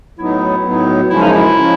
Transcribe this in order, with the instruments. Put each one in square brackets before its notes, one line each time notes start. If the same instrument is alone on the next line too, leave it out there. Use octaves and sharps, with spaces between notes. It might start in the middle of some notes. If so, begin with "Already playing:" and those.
[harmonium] A2 F#3 B3 D#4 [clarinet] E4
[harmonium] A2 F#3 B3 D#4
[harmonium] F#2 C#3 F3 G#3 C#4 [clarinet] E4
[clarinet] D#4
E4
[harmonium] C#3 F3 G#3 C#4